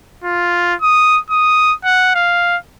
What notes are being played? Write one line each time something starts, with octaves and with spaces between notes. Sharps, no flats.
F4
D#6
D#6
F#5
F5